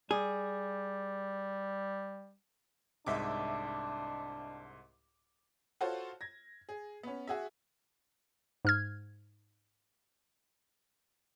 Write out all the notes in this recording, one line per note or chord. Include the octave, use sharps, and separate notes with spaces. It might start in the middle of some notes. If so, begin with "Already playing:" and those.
G3 G#4
C2 G#2 D4 D#5 E5 D6
F4 F#4 A4 C5 C#5
G#6 A#6
G#4
B3 C#4
F#4 G#4 E5
G#2 F6 G#6